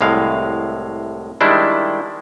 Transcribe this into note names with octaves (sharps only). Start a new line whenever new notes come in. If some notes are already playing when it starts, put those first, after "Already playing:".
C2 A2 G#3 F5
D#3 G3 G#3 D4 E4